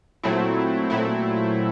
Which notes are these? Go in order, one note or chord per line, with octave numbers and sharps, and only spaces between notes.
A#2 F#3 A3 C4 E4
A#2 F#3 A3 C4 E4